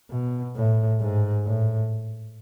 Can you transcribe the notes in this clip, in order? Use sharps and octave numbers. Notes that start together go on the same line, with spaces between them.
B2
A2
G#2
A2